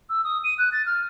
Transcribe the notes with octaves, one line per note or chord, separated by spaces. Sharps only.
E6
D#6
D#7
F#6
A6
F6